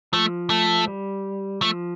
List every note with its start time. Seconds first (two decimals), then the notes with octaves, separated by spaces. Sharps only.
0.13 F3 A3
0.50 A3
0.88 G3
1.62 F3 A3